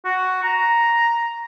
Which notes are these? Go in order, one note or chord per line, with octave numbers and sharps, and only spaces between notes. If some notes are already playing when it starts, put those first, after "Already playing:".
F#4
A#5